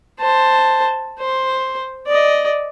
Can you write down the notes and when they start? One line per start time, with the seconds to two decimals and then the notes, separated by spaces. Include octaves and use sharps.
0.20 C5 A5
1.19 C5
2.07 D5 D#5